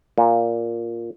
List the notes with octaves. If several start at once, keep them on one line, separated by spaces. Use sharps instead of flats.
A#2